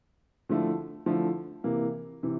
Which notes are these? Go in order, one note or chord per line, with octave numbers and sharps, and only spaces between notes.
D3 F3 A3 E4
D3 F3 A3 E4
C3 E3 A#3
C3 E3